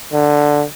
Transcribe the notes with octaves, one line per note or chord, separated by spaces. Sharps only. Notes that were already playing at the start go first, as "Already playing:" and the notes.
D3